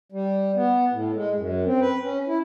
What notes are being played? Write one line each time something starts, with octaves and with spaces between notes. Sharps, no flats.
G3
B3
A2
G#3
F#2
C4
B4
C#4
E4